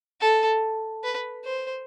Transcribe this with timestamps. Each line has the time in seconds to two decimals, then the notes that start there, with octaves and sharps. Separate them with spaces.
0.20 A4
1.04 B4
1.45 C5